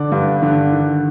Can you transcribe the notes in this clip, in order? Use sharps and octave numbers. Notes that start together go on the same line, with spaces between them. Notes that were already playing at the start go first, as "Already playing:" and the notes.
Already playing: D3 D5
G2
D3
D#3